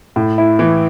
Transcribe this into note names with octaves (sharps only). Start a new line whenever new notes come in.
A2
E4
E3